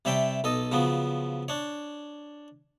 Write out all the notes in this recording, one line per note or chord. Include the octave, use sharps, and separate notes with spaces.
C3 G3 C#5 E5 G5 A5
B1 A4 D#5
C#3 F3 F#3 B3
D4 C#5